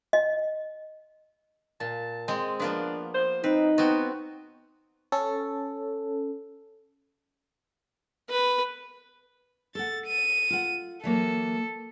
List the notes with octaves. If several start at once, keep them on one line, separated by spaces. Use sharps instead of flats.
D#5
A#2 A5
G#3 C4
F3 A#3 B3 D4
C5
C4 D#4 B4
B3 C4 F#4
C#4 A4
B4
A4 F#5 A6
D#7
F4 F#5
E3 F#3 A#3 A4